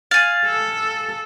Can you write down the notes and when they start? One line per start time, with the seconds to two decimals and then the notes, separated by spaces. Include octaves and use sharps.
0.11 F5 G#5 A6
0.46 A4